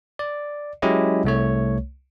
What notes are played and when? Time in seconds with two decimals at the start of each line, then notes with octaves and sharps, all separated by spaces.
0.19 D5
0.82 F#3 G#3 C#4 E4 G4 D#5
1.25 C2 A3 C#5